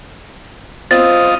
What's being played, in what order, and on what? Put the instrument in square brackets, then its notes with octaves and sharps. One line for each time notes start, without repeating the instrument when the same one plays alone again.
[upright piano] C4 [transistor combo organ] F4 D#5 [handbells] A6